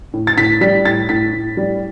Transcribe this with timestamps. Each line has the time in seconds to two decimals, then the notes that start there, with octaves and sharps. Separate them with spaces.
0.13 A2
0.27 A6
0.37 A2 B6
0.61 G3 B6
0.85 A2 A6
1.09 A2 B6
1.33 A2
1.57 G3